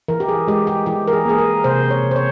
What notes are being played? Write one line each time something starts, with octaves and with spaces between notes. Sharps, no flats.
E3 A#4
G4
G#4
G#3 G4
G4
E3 G4
A#4
G#4
A#3 G#4
A#4
C3 C5
C#5
C3
C5
C#5